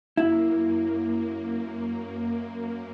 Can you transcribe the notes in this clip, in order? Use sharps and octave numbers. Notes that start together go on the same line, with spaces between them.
F#2 A#3 E4